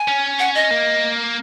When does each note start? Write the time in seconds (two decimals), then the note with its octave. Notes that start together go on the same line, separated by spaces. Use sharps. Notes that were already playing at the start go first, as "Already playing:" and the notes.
Already playing: G#5
0.08 C#4
0.39 F#5
0.55 D#5
0.71 A#3